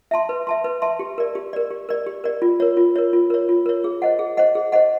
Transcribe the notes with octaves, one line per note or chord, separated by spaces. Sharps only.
E5 A5 C6
B4
E5 A5 C6
B4
E5 A5 C6
G4
A#4 D5
G4
A#4 D5
G4
A#4 D5
G4
A#4 D5
F4
A#4 C#5
F4
A#4 C#5
F4
A#4 C#5
F4
A#4 C#5
G#4
C5 D#5 F#5
G#4
C5 D#5 F#5
G#4
C5 D#5 F#5